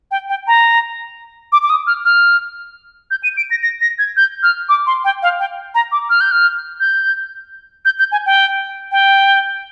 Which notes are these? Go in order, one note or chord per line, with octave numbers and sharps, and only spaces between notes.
G5
G5
A#5
D6
D6
D#6
F6
F6
G6
D#7
D7
A#6
A#6
A#6
G#6
G6
F6
D6
C6
G5
F5
G5
A#5
D6
F6
G6
F6
G6
G6
G6
G#5
G5
G5